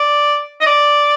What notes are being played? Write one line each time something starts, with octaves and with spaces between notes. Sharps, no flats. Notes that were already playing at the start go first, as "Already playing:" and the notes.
Already playing: D5
D#5
D5